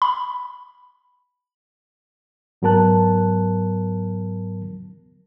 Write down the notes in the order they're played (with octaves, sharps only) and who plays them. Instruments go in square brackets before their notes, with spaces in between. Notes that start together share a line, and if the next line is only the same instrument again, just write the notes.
[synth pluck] B5
[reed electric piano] G#2 F#3 B3 A#4 A5 F#6